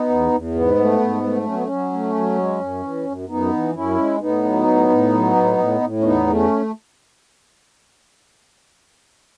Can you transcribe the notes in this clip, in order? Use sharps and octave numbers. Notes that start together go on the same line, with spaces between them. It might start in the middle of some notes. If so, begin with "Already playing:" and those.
Already playing: B3 D#4
E2
E2
G#2 B3
A3
G#2
A3
F#3 C#4
B3
C#4
F#3
A3
F#3
G#3
F#2
E3
F#2
F#2 B3 D#4
E3
F#2 C#4 E4
G#3
A2 B3 D#4
F#3
A2
A2
F#3
A2
A2
A2
C#4
E2 B3 D#4
A3
C#4